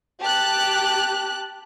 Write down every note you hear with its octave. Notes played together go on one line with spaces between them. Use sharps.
G4 A5 F#6